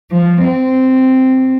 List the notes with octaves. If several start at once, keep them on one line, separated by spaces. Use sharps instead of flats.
F3
C4